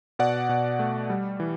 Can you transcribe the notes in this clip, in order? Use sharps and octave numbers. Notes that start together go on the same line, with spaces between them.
B2 D5 F#5
B2
A3
G3
E3